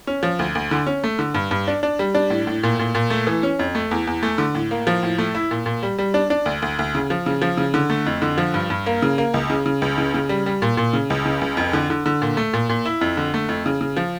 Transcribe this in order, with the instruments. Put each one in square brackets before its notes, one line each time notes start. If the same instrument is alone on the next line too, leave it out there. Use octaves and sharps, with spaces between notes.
[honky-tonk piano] C#4
F3
D2
D2
D3
C#4
A3
D3
G2
G2
D4
D4
G3
D4
A2
A2
A#2
A#2
A#2
A3
E3
C#4
F2
A3
E2
E2
A3
D3
A2
A#3
F3
A2
A3
E4
A#2
A#2
G3
G3
D4
D4
D2
D2
D2
C#3
F3
C#3
F3
C#3
D3
A3
F2
D3
F3
G2
G2
A#3
C#3
A#3
C#2
C#3
C#3
C#2
C#3
C#3
G3
G3
A#2
A#2
C#3
C#2
C#3
C#2
F2
D3
D3
D3
A#2
A3
A#2
A#2
E4
F2
D3
A3
F2
C#3
C#3
F3